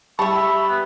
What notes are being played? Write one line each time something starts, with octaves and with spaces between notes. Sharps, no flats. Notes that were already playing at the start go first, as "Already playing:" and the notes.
G3 A3 A5 B5 C#6
E5
B3